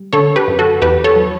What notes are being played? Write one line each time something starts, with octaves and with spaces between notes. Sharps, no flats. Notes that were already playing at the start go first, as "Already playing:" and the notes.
Already playing: G3
D3 A4 C#5
G4 B4
F#2
F#4 A4
E2 G4 B4
A4 C#5
F#3